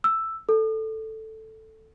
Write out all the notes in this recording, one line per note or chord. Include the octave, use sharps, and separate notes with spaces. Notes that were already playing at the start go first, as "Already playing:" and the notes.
E6
A4